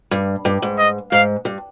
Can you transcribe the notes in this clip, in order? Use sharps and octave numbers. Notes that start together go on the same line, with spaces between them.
G2
G2
G#2
D#5
G#2 F5
G2